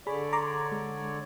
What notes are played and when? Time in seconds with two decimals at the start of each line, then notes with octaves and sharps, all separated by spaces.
0.07 D3 G#4 C#5 D5 B5
0.33 A#5 C6 D6
0.72 G#3